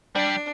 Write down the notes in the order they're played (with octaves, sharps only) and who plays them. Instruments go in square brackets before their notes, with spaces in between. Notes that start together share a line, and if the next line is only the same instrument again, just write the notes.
[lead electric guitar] G3 [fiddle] D4